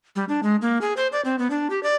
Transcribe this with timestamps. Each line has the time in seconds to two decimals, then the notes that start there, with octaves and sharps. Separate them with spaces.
0.16 G3
0.29 D4
0.43 G#3
0.62 A#3
0.81 G#4
0.97 C5
1.12 D5
1.25 C4
1.39 B3
1.50 D4
1.70 G4
1.83 D5